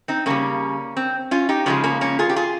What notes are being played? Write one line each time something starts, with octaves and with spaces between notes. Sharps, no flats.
C4 D#4
C#3 G3 A#3 C#4
C4
C#4 F4
D#4 G4
C#3 F3 G#3 C#4 F4
A#3 C#4
A#3 C#4
F4 G#4
G4
F4 G#4